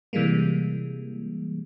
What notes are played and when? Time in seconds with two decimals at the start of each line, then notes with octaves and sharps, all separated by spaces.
0.13 C3 E3 G3 G#3 A#3